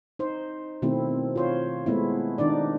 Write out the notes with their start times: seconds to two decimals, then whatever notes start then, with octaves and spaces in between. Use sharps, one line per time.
0.19 D#4 C5
0.82 B2 D#3 A3 C4 E4
1.36 F4 C5 C#5
1.86 G#3 A3 B3 E4
2.38 D#3 D4 D#4 D5